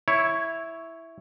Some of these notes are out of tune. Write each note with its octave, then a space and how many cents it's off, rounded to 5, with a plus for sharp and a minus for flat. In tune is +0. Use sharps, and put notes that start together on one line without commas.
E4 +0 C#5 +0